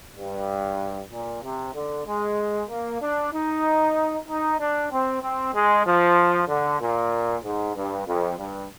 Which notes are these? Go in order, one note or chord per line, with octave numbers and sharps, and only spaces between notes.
G2
A#2
C3
D3
G#3
A#3
D4
D#4
D#4
D4
C4
C4
G#3
F3
D3
A#2
G#2
G2
F2
G2